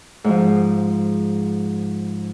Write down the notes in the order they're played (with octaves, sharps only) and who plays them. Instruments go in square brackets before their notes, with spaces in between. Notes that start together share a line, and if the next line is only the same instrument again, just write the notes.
[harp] G#2 F3